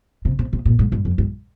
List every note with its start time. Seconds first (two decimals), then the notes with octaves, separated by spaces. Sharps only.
0.25 C3
0.39 C3
0.53 C3
0.65 A#2
0.79 G#2
0.92 G2
1.05 F2
1.18 G2